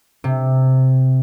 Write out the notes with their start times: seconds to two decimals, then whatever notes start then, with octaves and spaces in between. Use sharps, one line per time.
0.24 C3